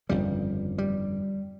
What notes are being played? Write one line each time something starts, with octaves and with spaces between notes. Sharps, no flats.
G1 F2 C#3 G3
G3